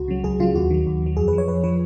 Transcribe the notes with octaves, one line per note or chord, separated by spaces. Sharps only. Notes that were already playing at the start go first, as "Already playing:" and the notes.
Already playing: C#2 F#4
C#3 F#3
C#2 G#4
C#3 F#3 F4
D#2 F#4
D#3 F#3
D#2
D#3 F#3
F2 G#4
B4
F3
C#5
F2 B4
F3 B4